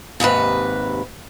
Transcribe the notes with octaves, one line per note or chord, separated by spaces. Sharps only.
D#2 G#2 C3 B4